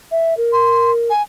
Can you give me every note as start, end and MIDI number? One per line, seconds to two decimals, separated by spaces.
0.11 0.36 76
0.37 1.10 70
0.53 0.91 84
1.10 1.22 80